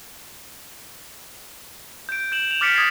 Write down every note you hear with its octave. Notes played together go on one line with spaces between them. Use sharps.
G6 D7
G6 E7 F#7
E7 F7
D6 F6 A6 B6 C#7 D7
D6 D#6 G#6 A6 C7 F7